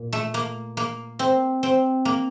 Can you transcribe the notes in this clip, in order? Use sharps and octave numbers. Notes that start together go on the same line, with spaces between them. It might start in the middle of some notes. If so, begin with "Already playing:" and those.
Already playing: A#2
A3
A#3
A#3
C4
C4
A#3